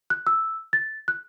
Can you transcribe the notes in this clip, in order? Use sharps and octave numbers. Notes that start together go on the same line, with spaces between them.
F#6
E6
A6
F#6